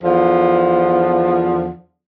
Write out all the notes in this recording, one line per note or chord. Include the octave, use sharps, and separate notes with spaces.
E2 D3 F3